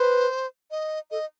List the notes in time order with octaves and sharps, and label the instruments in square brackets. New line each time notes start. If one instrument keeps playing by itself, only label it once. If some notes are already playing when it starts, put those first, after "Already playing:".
Already playing: [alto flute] B4 [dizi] C5
[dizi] D#5
[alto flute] A4 [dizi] D#5